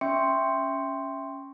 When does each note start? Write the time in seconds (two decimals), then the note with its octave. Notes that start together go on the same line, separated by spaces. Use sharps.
0.01 C#4 E5 G5 C6 C#6 C#7